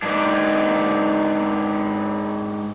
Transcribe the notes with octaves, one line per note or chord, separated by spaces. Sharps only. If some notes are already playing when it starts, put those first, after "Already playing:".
G#2 D4